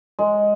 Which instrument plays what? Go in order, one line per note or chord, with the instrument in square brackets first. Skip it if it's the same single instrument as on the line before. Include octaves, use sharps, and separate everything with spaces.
[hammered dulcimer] G#3